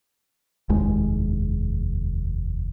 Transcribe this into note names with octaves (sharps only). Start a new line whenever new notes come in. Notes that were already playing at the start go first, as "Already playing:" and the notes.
F1 D#2 G#3